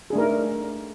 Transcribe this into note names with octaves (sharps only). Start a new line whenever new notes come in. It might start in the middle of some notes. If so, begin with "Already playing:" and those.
A3 D4 D#4 G#4 A#4